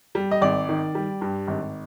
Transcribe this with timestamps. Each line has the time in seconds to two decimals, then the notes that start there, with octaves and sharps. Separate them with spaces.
0.15 G3
0.31 D#5
0.41 G#1 D5
0.69 D#3
0.95 G3
1.21 G2
1.48 G#1